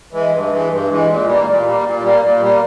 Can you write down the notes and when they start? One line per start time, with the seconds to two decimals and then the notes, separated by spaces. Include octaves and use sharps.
0.12 E3 G#3
0.31 G2
0.49 E3 G#3
0.69 G2
0.89 E3 G#3
1.07 A#2
1.26 G3 A#3
1.45 A#2
1.65 G3 A#3
1.84 A#2
2.02 G3 A#3
2.22 A#2
2.41 G3 A#3